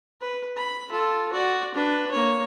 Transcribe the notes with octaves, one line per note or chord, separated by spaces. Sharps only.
B4
B5
F4 A4
F#4 D5
D4 B4
A#3 C#5